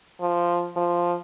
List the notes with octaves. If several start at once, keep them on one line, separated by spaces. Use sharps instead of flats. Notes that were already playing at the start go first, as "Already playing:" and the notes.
F3
F3